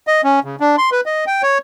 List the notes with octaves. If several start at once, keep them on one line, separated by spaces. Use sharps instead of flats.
D#5
C#4
C#3
D4
C6
B4
D#5
G5
C#5